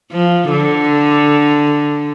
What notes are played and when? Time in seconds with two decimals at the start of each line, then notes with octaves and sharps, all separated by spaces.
0.12 F3
0.51 D3